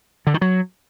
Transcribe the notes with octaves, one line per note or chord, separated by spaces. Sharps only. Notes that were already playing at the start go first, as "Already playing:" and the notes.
D3
D#3
F#3